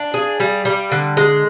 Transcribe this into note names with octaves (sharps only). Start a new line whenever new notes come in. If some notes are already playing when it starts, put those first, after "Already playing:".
Already playing: D4
G#4
G3
G3
D3
G#3